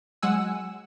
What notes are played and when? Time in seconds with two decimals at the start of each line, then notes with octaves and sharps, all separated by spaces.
0.23 F#3 G#3 F#5 G#5 E6